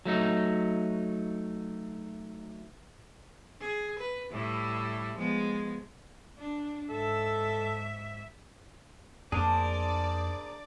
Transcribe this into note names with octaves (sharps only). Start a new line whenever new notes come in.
F#3 A3 D#4
G#4
B4
A2 G3 E4
F3 G#3 B3
D4
G#2 A4 E5
F2 A#3 D4 G#4 A#4 C5 D5